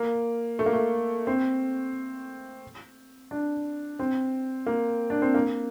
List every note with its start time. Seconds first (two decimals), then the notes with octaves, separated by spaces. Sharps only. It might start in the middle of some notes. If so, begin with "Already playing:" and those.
Already playing: A#3
0.59 A3
0.66 A#3
0.73 A3
1.27 C4
3.31 D4
3.99 C4
4.66 A#3
5.10 D4
5.22 C4
5.34 A#3